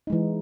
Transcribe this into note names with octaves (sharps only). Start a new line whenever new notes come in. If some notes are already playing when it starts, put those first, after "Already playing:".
E3 G#3 D#4